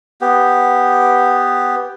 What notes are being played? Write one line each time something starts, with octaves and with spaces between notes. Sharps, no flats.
B3 G4